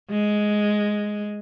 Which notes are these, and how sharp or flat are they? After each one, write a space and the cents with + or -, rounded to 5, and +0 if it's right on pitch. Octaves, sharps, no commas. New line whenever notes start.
G#3 +5